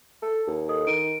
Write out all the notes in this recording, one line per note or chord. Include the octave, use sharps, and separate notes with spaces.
A4
D#2
A4 D#5 D#6
D#3 D7 D#7